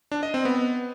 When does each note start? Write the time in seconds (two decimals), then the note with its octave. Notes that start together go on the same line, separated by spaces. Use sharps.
0.12 D4
0.23 D#5
0.34 C4
0.45 B3